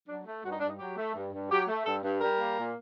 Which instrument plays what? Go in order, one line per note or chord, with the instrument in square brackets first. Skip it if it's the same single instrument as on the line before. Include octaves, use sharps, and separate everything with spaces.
[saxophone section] F#3 D4
A3
G2 F#4
D#4
G2 D4
D#4
F#3 G4
A3
G2
G2
F#3 G4
A3
G2 A4
G2
G3 A#4
A#3
A#2